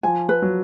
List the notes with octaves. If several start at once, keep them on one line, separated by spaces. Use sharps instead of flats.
F3 G#5
B4
F#3